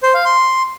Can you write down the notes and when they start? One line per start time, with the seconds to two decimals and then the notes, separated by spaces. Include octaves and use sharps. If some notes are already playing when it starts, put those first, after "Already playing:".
0.03 C5
0.14 F5
0.25 C6